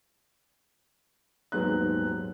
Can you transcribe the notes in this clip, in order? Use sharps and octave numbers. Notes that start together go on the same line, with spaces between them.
D#1 G#2 F#3 G#3 B3 F#6